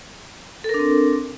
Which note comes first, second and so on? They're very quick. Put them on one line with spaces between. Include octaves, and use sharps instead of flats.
A4 A#4 D4 C4